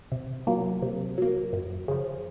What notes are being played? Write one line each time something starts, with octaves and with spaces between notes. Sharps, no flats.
C3
F#3 A#3
C3
F#3 A#3
F#2
C#3 F3